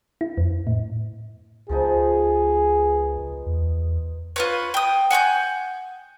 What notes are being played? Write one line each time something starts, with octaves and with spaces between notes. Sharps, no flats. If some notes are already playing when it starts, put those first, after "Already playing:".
E4
F2
A2
C#2 F3 B3 D#4 G#4
E2
F4 B4 C#5
G5 D#6
F#5 G#5 C#6 G6